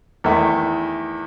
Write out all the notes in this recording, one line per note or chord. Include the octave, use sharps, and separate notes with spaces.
E2 D#3 A3 E4